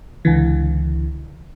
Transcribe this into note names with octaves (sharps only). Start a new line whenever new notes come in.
C#2 D3 E3